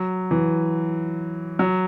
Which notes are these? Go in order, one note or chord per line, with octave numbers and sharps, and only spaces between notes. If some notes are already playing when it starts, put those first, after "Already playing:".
Already playing: F#3
E3
F#3